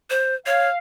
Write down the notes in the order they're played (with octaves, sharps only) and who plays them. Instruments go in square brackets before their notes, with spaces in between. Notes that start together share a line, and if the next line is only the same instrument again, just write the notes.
[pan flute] C5
[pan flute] C#5 [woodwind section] F5